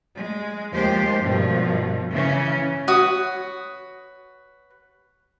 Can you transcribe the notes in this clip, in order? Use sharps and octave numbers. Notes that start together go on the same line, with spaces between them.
G#3
D#2 F3 G#3 G4 C5
G2 B2 D#3 F3
C#3 E3 C#4
F#4 B4 C#5 D#6